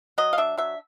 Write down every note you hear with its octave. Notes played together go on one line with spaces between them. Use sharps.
F#3 D#5
F5
D4 E5
F#3 E5